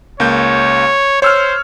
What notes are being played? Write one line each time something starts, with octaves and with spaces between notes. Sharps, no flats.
C#2 A#3 C#5 G6
C5 C#5 E6 F6